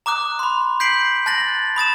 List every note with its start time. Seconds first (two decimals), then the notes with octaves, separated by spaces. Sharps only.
0.06 A#5 D6 D#6 F#6
0.39 B5 C6
0.80 G6 B6 C7 D7 F#7
1.26 A5 F#6 A6 A#6 F#7
1.76 B5 D#6 A6 E7